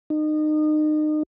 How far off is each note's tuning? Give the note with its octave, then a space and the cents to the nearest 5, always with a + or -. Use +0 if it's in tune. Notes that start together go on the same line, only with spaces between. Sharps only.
D#4 -30